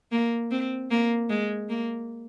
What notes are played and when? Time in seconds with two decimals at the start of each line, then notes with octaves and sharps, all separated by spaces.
0.12 A#3
0.51 C4
0.91 A#3
1.29 G#3
1.69 A#3